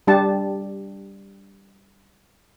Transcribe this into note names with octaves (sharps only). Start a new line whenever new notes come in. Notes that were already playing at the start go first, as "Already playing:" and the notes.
G3 D4 G4 A5